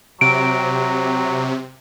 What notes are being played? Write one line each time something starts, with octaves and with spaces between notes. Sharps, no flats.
C3 F#3 D7